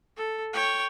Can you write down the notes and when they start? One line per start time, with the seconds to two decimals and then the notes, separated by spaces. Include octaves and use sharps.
0.17 A4
0.53 C#5 G5